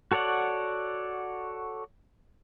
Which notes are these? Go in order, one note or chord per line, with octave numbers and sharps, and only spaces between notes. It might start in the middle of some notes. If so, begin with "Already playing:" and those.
F#4 A4 C#5 D5 F#5